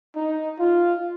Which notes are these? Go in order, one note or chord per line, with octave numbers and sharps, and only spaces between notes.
D#4
F4